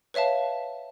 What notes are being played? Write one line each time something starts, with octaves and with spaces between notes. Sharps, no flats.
B4 C#5 E5 F5 A5